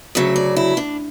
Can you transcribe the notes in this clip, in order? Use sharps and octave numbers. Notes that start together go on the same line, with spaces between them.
D2 C#3 F#3 E5
D5
E4
D4